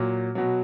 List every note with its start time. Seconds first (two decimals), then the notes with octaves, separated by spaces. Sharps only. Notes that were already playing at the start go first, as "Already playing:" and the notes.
Already playing: A#2 F#3
0.35 B2 F#3